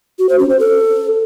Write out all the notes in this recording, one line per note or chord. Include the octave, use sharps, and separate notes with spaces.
F#4
C5
C#4
C5
A4